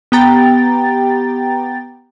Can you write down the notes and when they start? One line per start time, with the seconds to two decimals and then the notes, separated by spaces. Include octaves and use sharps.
0.12 B3 G4 G5 A#5 A6